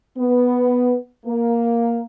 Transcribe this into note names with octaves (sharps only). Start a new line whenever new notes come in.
B3
A#3